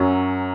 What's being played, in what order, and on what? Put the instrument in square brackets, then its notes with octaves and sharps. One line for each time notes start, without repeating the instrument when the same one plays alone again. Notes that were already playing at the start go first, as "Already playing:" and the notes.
Already playing: [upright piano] F#2 F#3 C#4 C#5